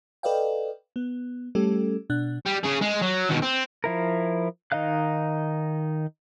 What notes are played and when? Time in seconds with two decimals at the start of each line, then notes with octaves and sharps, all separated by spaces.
0.23 A4 B4 D5 D#5 F5 G5
0.96 B3
1.55 G3 A3 C#4 G4 A4
2.10 B2 D4 F#6
2.46 G3
2.64 C#3 G#4
2.82 G#3
3.02 F#3
3.29 D#2 B2
3.43 C4
3.84 F3 E4 A#4
4.72 D#3 D#4 D#5 F5 F#6